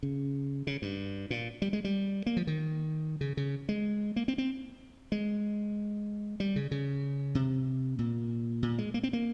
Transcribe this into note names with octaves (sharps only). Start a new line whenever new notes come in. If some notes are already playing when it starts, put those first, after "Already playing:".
C#3
C#3
G2
A#2
G3
G#3
G3
A#3
F3
D#3
C#3
C#3
G#3
A#3
C4
C4
G#3
G3
C#3
C#3
C3
A#2
A#2
G#3
A#3
C4
A#3